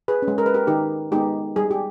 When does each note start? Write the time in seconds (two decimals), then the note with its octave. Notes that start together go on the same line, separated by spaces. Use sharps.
0.08 G#4 B4
0.22 C#4
0.28 G#3
0.38 A#4
0.46 B4
0.54 G4 A#4
0.67 D#3 D#4 G4
1.12 G#3 B3 D#4 G4
1.56 G3 G#4
1.71 G4